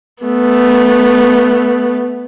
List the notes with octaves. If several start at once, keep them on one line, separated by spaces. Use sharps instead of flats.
A3 B3